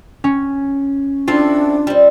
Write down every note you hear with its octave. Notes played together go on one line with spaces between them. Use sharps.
C#4
C4 D4 E4 F4 A4
G3 C4